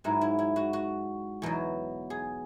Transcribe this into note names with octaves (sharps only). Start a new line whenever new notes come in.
G#2 F#3 E4
E4
E4
F#4
F#4
E2 B2 F#3
G#4